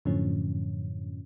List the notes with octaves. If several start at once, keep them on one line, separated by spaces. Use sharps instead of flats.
F#2 A2 D3 F3 C#4